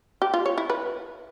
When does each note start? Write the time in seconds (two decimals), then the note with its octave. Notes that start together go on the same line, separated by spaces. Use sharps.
0.22 G4
0.34 F4
0.46 C#5
0.58 E4
0.70 B4